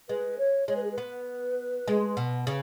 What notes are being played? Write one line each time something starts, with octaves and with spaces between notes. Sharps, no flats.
G#3 B4
C#5
G#3 C#5
B4
G#4
B4
B3
G#3
B2
C#3